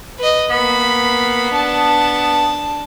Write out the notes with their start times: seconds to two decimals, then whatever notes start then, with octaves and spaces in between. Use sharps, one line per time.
0.19 B4 D#5
0.50 A#3 B3 B5
1.54 D4 A5